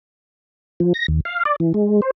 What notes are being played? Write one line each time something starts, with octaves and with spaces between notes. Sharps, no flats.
F3
A#6
D#2
F5
D5
E3
G#3
C5